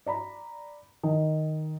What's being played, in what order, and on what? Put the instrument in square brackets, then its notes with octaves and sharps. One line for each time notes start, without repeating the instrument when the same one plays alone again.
[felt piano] D5 A#5 B5
D#3